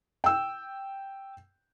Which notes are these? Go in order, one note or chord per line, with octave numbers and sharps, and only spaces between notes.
G5 E6